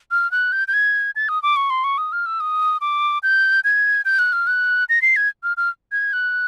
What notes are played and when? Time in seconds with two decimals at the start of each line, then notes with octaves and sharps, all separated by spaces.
0.11 F6
0.31 F#6
0.52 G6
0.68 G6
0.73 G#6
1.16 A6
1.29 D#6
1.43 D6
1.56 C#6
1.70 C6
1.84 C#6
1.98 D#6
2.12 F6
2.26 E6
2.40 D#6
2.81 D6
3.23 G6
3.64 G#6
4.05 G6
4.19 F#6
4.32 F6
4.47 F#6
4.89 A#6
5.02 C7
5.16 G#6
5.43 F6
5.57 F6
5.92 G#6
6.13 F#6